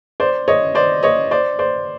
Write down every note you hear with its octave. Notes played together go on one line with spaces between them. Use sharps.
C5 D5
C#5 D#5
C5 D5
C#5 D#5
C5 D5
C5 D5